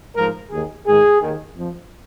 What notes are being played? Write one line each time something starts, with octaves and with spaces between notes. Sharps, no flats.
G#2 F3 A#4
D#2 D#3 G#4
G#2 D#3 G#4
D#2 D#3
F2 F3